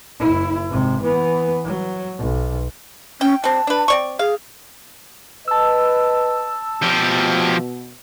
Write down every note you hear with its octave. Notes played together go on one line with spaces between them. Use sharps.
F#1 E4
G#1 C3
E3 B3
F#3
B1
C#4 G5
G3 C4 A5
D4 B4
C4 D5 C#6
G#4 F5
B4 D#5 A5 E6
B2 F3 G4